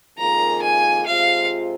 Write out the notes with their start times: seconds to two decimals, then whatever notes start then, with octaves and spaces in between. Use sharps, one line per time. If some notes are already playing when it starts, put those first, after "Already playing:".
0.18 F2 D#3 A#3 F4 G#4 A#5
0.62 G#5
1.05 C3 G#3 F4 C5 F5